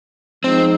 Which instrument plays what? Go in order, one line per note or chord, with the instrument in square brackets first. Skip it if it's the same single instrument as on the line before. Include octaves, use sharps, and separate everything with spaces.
[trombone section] F3 G#3 D#4 [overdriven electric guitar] C4